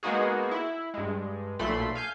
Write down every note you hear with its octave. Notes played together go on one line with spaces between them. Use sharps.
G#3 A#3 B3 D#4 F#4 G#4
E4
G2 G#3
B1 A#2 A3 B5 C6
F5 G#5 G6